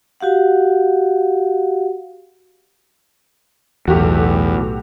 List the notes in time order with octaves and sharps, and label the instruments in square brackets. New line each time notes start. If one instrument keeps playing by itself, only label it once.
[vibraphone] F#4 G4 F5 F#5
[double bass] B1 A2 [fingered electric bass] E2 [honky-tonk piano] F#4 G4 A4